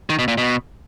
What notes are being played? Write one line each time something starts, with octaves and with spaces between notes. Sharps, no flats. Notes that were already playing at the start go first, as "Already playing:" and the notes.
D#3
B2
A#2
B2